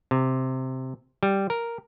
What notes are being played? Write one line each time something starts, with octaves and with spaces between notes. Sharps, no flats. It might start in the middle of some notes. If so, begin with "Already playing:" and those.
C3
G3
A#4